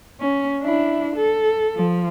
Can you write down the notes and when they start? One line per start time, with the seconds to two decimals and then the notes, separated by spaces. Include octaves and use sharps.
0.21 C#4
0.62 D4 E4
1.16 A4
1.76 F3